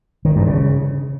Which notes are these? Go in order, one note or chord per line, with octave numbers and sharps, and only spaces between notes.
D#3
G2
C#3